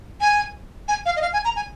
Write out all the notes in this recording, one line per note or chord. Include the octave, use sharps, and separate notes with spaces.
G#5
G#5
F5
D#5
F5
G#5
A#5
G#5